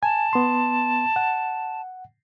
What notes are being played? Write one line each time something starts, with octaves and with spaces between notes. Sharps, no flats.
G#5 A5
B3 C6
F#5